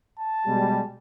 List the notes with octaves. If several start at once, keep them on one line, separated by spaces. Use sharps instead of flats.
A5
B2 G3 G#3